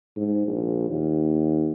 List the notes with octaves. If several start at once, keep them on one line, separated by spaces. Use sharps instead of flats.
G#2
A#1
D#2